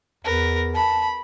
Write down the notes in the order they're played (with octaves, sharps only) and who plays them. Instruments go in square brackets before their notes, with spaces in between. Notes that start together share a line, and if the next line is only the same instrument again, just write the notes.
[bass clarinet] E2 [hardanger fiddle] A#4 B4
[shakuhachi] A5 [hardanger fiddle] B5